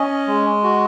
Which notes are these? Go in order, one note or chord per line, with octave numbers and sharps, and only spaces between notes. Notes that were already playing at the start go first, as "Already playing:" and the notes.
Already playing: C#4 D#5
G#3
F#4